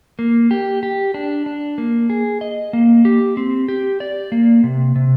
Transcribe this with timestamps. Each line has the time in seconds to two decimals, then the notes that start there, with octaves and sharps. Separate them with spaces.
0.19 A#3
0.51 G4
0.83 G4
1.14 D4
1.46 D4
1.78 A#3
2.10 G#4
2.41 D#5
2.73 A#3
3.05 G4
3.37 C4
3.68 G4
4.00 D5
4.32 A#3
4.63 C3
4.96 C3